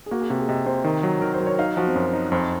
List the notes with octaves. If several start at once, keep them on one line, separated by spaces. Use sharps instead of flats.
G#4
A#3 F#4
G#4
C3 F#4
G#4
C3 D#5
C3 C5
D#3
F#3
D#3 A#4
C5
F#3
C#5
D#4 F5
F3 F#4
C4
F#2 C#4
D#4
F2 C5